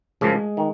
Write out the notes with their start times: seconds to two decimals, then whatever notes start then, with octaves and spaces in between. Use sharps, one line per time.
0.21 F#2 C#3 F3 G#3
0.57 D#3